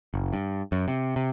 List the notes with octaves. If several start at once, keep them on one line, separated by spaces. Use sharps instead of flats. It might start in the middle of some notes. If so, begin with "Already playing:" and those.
F#1
G2
F#2
C3
C3